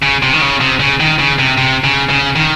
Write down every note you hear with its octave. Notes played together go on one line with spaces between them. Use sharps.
C#3
C3
D#3
C#3
C3
C#3
D#3
C#3
C3
C3
C#3
C#3
D#3